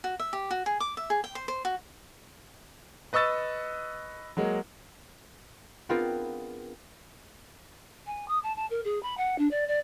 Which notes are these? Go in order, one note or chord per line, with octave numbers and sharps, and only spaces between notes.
F#4
E5
G4
F#4
G#4
D6
E5
G#4
G5
C5
C5
F#4
B4 D#5 C#6 E6 A6
F#3 G#3 A#3
B3 C4 D4 F4 G#4 A#4
G#5
D#6
A5
A5
A#4
G#4
B5
F#5
D4
D5
D5